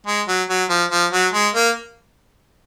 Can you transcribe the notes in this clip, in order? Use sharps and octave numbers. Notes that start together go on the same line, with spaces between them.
G#3
F#3
F#3
F3
F3
F#3
G#3
A#3